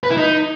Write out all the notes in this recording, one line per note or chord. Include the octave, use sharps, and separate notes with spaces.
B4
E4
D#4